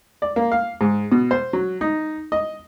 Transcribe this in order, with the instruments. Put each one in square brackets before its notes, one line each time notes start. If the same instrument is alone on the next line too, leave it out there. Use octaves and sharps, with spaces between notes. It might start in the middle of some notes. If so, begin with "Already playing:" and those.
[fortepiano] D5
A#3
F5
G#2
B2
C5
F#3
D#4
D#5